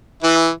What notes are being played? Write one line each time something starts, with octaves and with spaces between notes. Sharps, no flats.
E3 E4